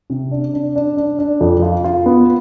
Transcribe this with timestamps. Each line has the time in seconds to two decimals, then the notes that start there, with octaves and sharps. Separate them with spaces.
0.10 C3
0.31 D4
0.54 D4
0.76 D4
0.97 D4
1.19 D4
1.41 F2
1.62 F4
1.84 F4
2.06 B3